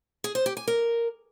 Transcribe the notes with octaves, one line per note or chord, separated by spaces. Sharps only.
G#4
C5
G4
G#5
A#4